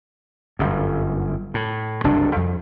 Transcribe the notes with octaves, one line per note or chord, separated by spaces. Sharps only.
G1 F#2
A2
F#1 C2 G2 D4
F2